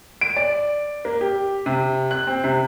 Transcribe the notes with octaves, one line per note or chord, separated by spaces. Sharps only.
D7
D5
A#3
G4
C3
F#6
C4
C3